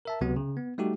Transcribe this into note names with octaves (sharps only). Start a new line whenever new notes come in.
A#4 E5 A5
C#2 C3 F#3 B3 F#4
C#3
B3
G3 A3 D#4 F#4 G4